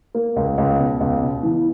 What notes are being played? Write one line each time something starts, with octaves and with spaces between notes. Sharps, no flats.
A#3
C#2
C#2
B2
C#2
B2
E3